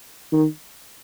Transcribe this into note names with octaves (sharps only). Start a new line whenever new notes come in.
D#3